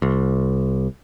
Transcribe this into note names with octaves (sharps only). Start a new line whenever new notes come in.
C2